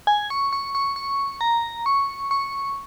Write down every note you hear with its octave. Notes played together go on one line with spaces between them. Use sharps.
G#5
C#6
C#6
C#6
C#6
A#5
C#6
C#6